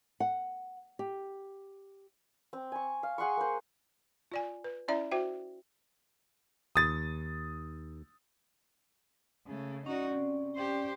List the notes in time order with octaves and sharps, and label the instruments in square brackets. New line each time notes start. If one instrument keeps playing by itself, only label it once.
[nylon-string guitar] F#5
G4
[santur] C4
G#5 C#6
F5
G#4 F#5 C6 C#6
A#3 C5
[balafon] F4 D5 G#5
B4
C#4 E4 D5 E5 A#5
F#4 C5 E5 G5
[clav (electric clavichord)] D#2 [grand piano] D#6 A6
[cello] C#3 A3
[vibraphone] C#4 D5 [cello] D#4 F#4
[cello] C3
G4 C5